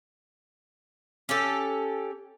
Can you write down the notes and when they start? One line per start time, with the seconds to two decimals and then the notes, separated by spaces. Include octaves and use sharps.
1.29 C#4 G4 A4